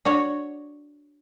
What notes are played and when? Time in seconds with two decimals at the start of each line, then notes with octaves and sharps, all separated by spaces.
0.05 D4 F#4 C#5